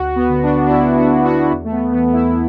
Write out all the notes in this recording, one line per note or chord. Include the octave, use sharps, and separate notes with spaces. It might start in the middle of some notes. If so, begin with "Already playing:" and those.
Already playing: D2 F#4
B3
D3
D4
D4
D2 E4
F#4
D3
F#4
E2
A3
B3
E3 B3
E4